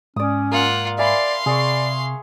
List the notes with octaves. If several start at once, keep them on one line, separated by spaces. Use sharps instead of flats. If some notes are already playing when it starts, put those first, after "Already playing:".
G#2 C#4 D5 D#6
A#3 F4 F5 F#5
D5 E5 F5 G#5 B5 C6
C3 G#4 D5 C#6